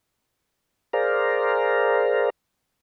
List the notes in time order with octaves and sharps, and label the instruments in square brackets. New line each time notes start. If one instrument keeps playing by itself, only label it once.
[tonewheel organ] G#4 A#4 C5 D5 F5 A#5